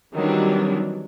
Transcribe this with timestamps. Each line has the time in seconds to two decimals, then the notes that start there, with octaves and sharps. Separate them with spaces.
0.13 D#3 E3 F#3 G3 C4 D4